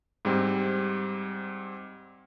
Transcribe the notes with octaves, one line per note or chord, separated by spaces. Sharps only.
G#2 G3 C4